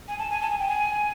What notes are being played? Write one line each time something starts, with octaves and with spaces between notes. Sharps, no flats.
G#5
A5
G#5
A5
G#5
G5
G#5